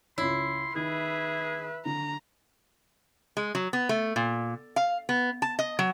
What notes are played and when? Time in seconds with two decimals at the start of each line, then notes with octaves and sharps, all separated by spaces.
0.18 C#2 E4 C#5 C6
0.76 D#3 G#4 B4 E5
1.85 D3 A#5
3.37 G#3
3.55 F#3
3.73 B3
3.89 A3
4.16 A#2
4.76 F5
5.09 B3
5.42 A5
5.59 D#5
5.79 F#3